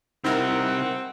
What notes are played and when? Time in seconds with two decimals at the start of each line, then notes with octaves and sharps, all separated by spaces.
0.24 C3 G3 C4 D#4 E4 A#4 F#5